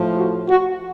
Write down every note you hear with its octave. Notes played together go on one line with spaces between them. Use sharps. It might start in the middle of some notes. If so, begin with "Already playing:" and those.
Already playing: A2 F3
F#4
F#4